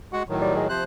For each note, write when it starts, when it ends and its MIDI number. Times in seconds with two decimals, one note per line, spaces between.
0.13 0.23 56
0.13 0.23 66
0.13 0.23 78
0.29 0.68 45
0.29 0.68 51
0.29 0.68 54
0.41 0.52 55
0.56 0.67 56
0.69 0.83 48
0.69 0.84 53
0.69 0.84 72
0.69 0.84 90